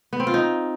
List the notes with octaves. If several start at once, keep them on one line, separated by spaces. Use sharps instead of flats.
B3
C4
F4
D#4